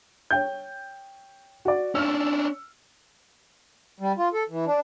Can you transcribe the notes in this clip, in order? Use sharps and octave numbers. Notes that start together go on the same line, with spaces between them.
C#5 G5 G6
F#4 D5
C#4 D4 E6 F6
G3
F4
A4
E3
D4